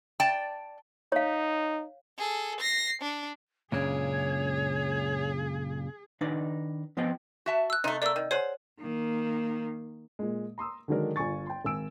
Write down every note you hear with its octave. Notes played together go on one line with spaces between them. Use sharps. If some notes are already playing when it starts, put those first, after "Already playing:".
D5 G5 A5
D#4 C#5 F5
G#4 A4
A#6 C7
D4
C#2 F#2 A#2 C#3 D4 G#4 C#5
D#3 D4 D#4 B4 D5
F3 B3 C4 F4 D#5 G5
F#4 E5 A5
E6 F#6
C3 A3 D#4
A3 A#3 D5 E6
D#3
G#4 C5 C#5 F#5
D#3 A#3
A#2 G#3
A#5 C6 D#6 E6
D3 D#3 F#3 G#3 D4 A#4
G1 F4 G#5 C#6 A6
G5 C6
G#1 G#5 E6 D7